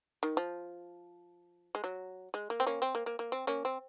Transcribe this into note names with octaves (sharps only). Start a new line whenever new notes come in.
D#3
F3
G#3
F#3
G#3
A#3
C4
A#3 C#4
C4
A#3
A#3
A#3
C4
A#3 C#4
C4